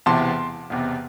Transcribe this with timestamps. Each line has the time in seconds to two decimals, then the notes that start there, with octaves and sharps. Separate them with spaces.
0.06 E1 E2 C3 E3 A5 C6
0.70 E1 E2 C3